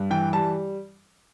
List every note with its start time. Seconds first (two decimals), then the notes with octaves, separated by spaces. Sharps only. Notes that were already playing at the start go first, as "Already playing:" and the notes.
Already playing: G2
0.10 E3 G5
0.33 G3 A5